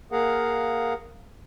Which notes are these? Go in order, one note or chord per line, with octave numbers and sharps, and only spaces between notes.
A#3 G#4 A#4 F5 F#5